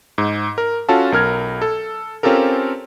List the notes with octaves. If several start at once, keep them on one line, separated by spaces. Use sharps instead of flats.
G#2
A#4
C#4 F4 F#4 A4 A5
B1 A#4 F6 G#6
A4
C4 C#4 F4 G4 A4 A#4